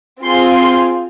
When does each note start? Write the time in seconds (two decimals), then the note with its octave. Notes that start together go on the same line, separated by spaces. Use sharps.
0.23 C4 F4 G#4 C6
0.56 C6